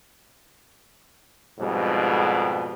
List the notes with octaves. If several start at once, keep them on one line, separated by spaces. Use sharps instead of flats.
F2 G#2 B2 G3